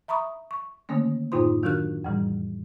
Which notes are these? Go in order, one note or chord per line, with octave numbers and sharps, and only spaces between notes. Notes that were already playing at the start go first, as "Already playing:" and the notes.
E5 A#5 B5 C#6 D#6
C#6
D3 D#3 A3 A#3 C#4
F#2 A2 D#4 F4 C5 C6
D#3 F#3 D4 F#4 A#4 F#6
F2 A2 E3 G3